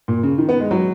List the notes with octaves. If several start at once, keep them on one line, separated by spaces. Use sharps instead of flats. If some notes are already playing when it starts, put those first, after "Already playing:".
A#2
C#3
D#3
B3
G#3
F#3